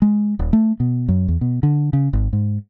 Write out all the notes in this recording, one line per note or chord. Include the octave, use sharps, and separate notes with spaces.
G#3
D#1
A3
B2
F#2
E2
B2
D3
C#3
G#1
G#2